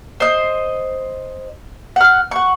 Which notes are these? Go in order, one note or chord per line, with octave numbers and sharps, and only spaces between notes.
C5 D#5
F#5 F6
F#5 C#6